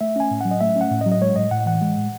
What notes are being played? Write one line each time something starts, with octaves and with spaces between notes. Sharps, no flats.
A3 E5
C#4 G#5
A2
F#3 F#5
D#5
A3 E5
C#4
F#5
A2
D#5
F#3
D#5
G#3 C#5
A2 D#5
A2 F#5
E3 F#5
G#3
A2